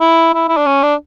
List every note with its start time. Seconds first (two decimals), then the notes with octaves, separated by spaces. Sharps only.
0.01 E4
0.34 E4
0.49 E4
0.57 D4
0.66 C#4
0.83 D4